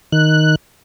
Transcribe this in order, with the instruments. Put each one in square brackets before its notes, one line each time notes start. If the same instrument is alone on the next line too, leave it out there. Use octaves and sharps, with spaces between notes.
[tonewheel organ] D#3 F#6